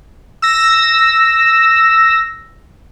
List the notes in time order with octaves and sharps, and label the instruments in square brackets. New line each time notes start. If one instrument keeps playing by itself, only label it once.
[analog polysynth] E6 A#6